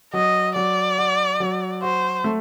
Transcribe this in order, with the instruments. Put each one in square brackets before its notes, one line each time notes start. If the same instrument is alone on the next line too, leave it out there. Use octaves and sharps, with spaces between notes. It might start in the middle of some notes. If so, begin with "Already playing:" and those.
[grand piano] F#3 [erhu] D#5
[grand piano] F#3 [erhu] D5
[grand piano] F#4
F#3
[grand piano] F#4 [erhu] C5
[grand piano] A3